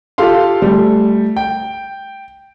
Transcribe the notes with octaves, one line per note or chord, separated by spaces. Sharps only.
F4 G4 A4 F5 C6
G3 A3
G5